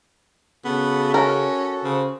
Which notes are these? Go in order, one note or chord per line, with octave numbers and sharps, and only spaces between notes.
C#3 B3 F#4 A4
C#4 A#4
C#3 C5